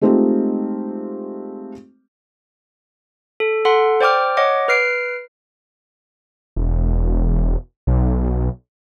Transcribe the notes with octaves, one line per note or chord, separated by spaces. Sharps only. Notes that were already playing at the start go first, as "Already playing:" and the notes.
G#3 A3 C4 D#4 F4 G4
A4
A4 F#5 C6
C5 D5 G5 D6 F6
C#5 D#5 F#5 D6
B4 F6 C7 D7
E1
B1